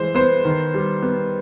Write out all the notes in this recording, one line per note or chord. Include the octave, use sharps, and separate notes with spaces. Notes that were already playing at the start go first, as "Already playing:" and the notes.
Already playing: E3 G#3 C5
B3 C5
D#3
G3
B3